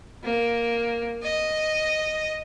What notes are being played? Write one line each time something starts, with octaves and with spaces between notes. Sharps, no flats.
A#3
D#5